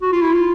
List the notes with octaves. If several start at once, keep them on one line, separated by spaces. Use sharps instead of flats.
F#4
F4
E4
F4